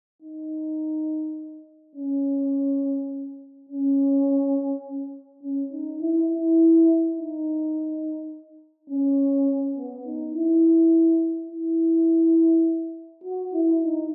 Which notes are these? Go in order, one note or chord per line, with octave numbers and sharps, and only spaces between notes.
D#4
C#4
C#4
C#4
D#4
E4
E4
D#4
C#4
B3
D#4
E4
E4
F#4
E4
D#4